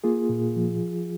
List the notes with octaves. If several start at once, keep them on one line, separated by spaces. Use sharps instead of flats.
A#3 F4 G#4
A#2
F3